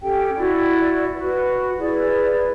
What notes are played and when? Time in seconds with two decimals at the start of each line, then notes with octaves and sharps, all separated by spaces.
0.01 C#4 G4 A4 G5
0.37 E4 F#4 D5
1.15 F#4 B4
1.78 E4 G#4 B4 D5